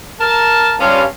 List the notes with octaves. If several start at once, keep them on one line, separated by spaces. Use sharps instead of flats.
A#4 A5
G2 C#4 F4